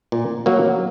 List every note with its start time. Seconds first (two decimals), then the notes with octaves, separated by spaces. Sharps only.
0.12 A#2
0.46 F#3 A#3